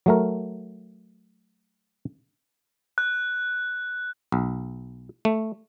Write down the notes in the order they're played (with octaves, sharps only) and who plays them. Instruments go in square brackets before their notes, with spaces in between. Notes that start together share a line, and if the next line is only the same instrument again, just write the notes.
[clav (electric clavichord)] F#3 A3 A#4
[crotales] F#6
[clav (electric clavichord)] B1
A3